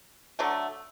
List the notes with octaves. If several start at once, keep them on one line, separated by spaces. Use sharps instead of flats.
D3 F#3 A3